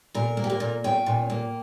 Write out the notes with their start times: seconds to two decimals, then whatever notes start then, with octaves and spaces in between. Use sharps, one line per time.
0.14 A#2 A#4
0.37 A#3
0.44 G4
0.50 A#4
0.60 A#2
0.84 C#4 G5
1.06 A#2
1.30 A#3